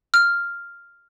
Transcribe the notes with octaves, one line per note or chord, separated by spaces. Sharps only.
F6